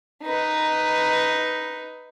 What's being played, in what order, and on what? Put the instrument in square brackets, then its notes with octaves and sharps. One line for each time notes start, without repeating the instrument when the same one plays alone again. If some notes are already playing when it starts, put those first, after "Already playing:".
[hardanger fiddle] D#4 B4